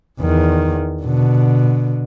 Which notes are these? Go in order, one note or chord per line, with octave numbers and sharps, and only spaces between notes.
E2 D#3
B2 D3